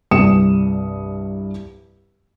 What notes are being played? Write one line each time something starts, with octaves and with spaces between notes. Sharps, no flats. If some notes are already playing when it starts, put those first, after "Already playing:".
C2 G2 D#6 C#7 E7